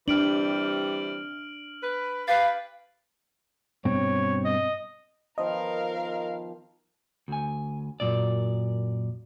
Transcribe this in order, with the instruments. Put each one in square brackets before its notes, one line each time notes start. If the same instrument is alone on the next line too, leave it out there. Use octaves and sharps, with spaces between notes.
[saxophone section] C3 E3 G3 [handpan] D4 [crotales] F6 D7 F#7
[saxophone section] B4
[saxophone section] G4 B4 [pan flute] F5 [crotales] A6
[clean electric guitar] G2 B2 C4 [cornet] C#5
[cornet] D#5
[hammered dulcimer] D#3 F3 B3 [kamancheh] A#4 F5 [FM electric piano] D#5
[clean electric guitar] D2 G#5
F#2 A#2 D5